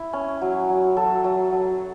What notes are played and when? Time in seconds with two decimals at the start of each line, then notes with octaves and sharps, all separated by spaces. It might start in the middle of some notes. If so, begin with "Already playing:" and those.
Already playing: E4
0.13 C#4
0.41 F#3
0.69 F#3
0.97 F#3 A4
1.24 F#3
1.52 F#3